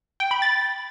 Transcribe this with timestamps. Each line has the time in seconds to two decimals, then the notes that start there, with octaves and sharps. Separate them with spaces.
0.20 G5
0.31 B5
0.42 A6